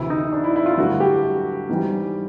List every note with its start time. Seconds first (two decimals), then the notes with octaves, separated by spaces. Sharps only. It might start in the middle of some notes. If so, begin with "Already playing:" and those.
Already playing: D2 C3 E3 E4
0.10 D#4
0.32 D4
0.44 E4
0.56 E4
0.66 F4
0.78 G2 D3 F#3 A3 F#4
1.00 G4
1.69 G#2 E3 G3